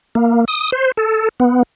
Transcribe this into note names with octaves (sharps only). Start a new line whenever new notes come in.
A#3
D#6
C5
A4
B3